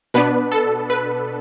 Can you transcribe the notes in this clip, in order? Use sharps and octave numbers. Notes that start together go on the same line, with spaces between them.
B2 B3 D4 B4
A4
B4